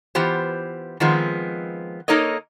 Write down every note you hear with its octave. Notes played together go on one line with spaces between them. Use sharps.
E3 B3 F4 G4 C5
D#3 F3 G#3 B3 C4
A#3 D#4 A4 A#4 C#5 D#5